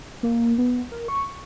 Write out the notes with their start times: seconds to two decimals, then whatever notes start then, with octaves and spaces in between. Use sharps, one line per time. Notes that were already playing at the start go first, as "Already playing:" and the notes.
0.23 A#3
0.58 B3
0.92 A#4
1.08 C#6